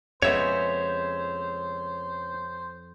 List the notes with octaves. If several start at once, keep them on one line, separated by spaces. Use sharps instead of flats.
F2 C#3 G#3 B3 C5 C#5 E5